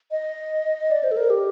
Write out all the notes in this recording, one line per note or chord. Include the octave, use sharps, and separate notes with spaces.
D#5
D5
C5
A4
A#4
G4